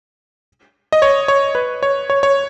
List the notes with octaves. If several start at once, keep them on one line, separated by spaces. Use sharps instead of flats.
D#5
C#5
C#5
B4
C#5
C#5
C#5